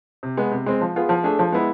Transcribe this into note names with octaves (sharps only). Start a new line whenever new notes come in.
C3
G#3 B3
C3
G#3 C4
F3
B3 F4 G#4
F3
A3 D4 G#4
F3
G#3 B3 E4